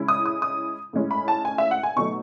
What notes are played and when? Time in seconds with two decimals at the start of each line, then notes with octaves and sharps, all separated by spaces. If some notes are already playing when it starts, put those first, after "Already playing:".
Already playing: C#3 G#3 C#4 E4
0.08 D#6
0.26 D#6
0.42 D#6
0.93 A2 G#3 C#4 E4
1.11 B5
1.28 A5
1.45 G#5
1.58 E5
1.71 F#5
1.83 G#5
1.96 B2 F#3 A3 D#4 C#6